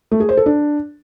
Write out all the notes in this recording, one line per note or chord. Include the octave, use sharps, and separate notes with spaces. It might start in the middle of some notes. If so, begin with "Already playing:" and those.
A3
G#4
C5
A4
D4